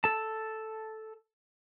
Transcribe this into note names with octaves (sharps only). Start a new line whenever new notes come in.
A4 A5